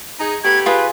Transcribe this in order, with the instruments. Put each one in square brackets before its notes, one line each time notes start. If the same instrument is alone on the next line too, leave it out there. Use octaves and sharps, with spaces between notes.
[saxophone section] D#4 G#4
[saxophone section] A3 B3 G4 [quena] G#6
[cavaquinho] F4 G#4 [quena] B4